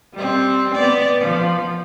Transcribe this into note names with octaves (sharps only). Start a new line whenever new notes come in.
G3 C4
B3 D5
F3